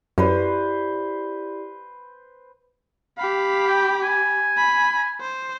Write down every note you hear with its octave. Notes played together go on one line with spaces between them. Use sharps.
F#2 E4 G4 B4 C5 D5
G4 F5 B5
G5
G#5
B5
C5